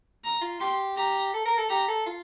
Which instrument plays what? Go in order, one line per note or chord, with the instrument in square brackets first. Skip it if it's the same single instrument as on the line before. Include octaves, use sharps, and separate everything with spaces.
[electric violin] A#5
[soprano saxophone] F4
[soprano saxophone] G4 [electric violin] C6
[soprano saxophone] G4 [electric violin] A#5
[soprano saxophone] A4
A#4
A4
[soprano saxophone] G4 [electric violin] A#5
[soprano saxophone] A4
F4